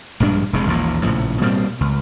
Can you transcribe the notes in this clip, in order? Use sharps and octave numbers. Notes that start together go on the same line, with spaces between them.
A#1 G2 G#3 D4
F1 C3 G#3
A1 D#2 A#2 F3
A#1 A2 C#3 F3
B2 G3 A#3 C4
C#2